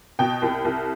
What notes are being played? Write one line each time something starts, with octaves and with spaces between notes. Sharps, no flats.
B2 G5
C2
C2